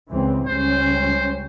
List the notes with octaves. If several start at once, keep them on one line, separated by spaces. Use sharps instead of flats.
C#2 E3 C4
C#2 G3 C#4 C5